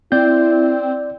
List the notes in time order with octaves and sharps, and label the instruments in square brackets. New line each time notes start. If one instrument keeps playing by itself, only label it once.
[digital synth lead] C4 [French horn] E4 [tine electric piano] D5 G6